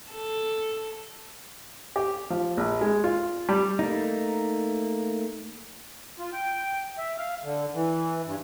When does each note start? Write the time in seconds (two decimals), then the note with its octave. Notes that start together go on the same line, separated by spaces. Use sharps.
0.10 A4
1.96 G4
2.30 F3
2.57 A#1
2.81 G#3
3.04 F4
3.49 G3
3.79 A3 A#3 D#4
6.19 F4
6.33 G5
6.98 E5
7.18 F5
7.43 D3
7.75 E3
8.26 G2